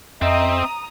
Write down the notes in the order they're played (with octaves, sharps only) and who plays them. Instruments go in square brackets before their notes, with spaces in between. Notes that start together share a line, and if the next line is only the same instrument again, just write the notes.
[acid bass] F2 [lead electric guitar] C4 [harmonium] D#5 E5 [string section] A#5 D#6